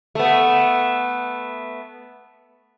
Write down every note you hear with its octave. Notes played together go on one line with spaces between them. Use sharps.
A3 B3